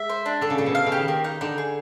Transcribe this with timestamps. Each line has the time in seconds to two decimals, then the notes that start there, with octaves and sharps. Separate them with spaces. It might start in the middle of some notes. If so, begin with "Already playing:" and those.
Already playing: G#3 E5
0.10 C5
0.26 D4
0.41 D3 A4
0.50 C#3
0.58 A#2 A4
0.66 B2
0.75 F5
0.86 C#3
0.92 G4
0.97 D#3
1.08 A#3
1.24 D#4
1.41 D3 D#4
1.58 G#4